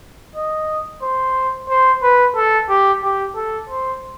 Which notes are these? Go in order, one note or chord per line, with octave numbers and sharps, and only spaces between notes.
D#5
C5
C5
B4
A4
G4
G4
A4
C5